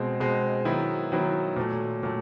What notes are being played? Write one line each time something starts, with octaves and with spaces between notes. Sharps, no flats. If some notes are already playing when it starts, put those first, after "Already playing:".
Already playing: B2 G#3 C4
B2 G#3 C4
D#3 F#3 B3 E4
D#3 F#3 B3 E4
A#2 F#3 A3
A#2 F#3 A3